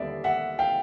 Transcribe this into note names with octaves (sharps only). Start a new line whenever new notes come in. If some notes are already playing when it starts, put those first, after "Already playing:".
Already playing: D#2 D3 G3 B3 D5 E5
E5 F#5
F5 G5